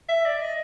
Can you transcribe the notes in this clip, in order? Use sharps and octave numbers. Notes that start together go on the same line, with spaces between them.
E5
D5
D#5